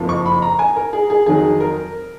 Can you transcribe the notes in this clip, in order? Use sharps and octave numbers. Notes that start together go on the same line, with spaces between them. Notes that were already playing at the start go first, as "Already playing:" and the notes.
Already playing: F#1 F2 F3
C#6
B5
A#5
G#5
A#4
G#4
G#4
F2 D#3 F#3 G#4
A#4